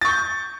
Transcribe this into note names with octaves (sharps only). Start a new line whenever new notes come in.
C#6 G6 A6